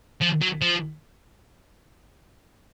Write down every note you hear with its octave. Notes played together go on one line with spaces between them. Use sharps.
F3
F#3
F3